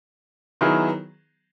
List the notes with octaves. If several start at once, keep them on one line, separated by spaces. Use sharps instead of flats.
D#3 F#3 B3 E4 G#4